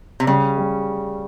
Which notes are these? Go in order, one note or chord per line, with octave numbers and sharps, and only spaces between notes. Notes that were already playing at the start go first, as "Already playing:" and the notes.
C3
C#3 G3
G3